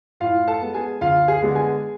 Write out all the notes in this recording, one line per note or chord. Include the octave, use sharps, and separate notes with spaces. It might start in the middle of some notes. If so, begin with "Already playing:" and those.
A2 F4 F5
A4 A5
G#3 B3
G#4 G#5
D2 F4 F5
G#4 G#5
D3 G#3 B3
G#4 G#5